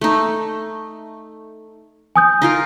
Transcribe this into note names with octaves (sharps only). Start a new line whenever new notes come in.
A3 D#4
G#5 D#6 G6
D#4 F4 A#4